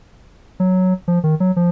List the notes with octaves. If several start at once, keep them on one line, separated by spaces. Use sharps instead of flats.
F#3
F3
D#3
F#3
F3